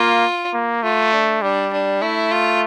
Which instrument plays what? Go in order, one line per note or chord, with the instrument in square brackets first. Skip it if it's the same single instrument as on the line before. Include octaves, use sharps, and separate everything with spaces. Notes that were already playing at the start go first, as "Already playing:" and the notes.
Already playing: [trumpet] A#3 [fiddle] F4
[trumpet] A#3
[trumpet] A3 [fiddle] F4
[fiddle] D4
[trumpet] G3 [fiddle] D4
[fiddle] D4
[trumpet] A3 [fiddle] E4
[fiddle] F4